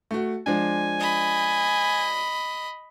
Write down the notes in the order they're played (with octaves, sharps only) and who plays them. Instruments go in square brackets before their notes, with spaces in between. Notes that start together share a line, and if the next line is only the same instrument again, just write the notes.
[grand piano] A3 F#4
[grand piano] F3 G#3 D4 [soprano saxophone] G#5
[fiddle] D#5 B5